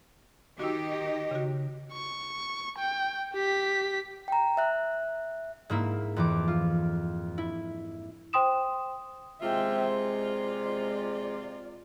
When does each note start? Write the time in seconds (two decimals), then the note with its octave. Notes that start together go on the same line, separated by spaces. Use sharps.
0.59 D#3 D#4 F#4 G4 E6
0.90 D#5
1.31 C#3 F#4
1.92 C#6
2.78 G5
3.33 G4 B6
4.28 G5 A#5
4.57 E5 F#6
5.70 G#2 A#3 E4 E6
6.16 F2 E3 D6
6.48 F4
7.38 E4
8.33 C5 G5 C6 D#6 E7
9.42 C3 G#3 F4 C5 E5 G5
10.09 D5